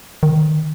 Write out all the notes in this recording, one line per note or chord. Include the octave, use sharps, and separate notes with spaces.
D#3